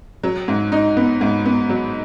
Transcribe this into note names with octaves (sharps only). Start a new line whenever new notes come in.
F#3
G#2
D#4
B3
G#2
B3
F#3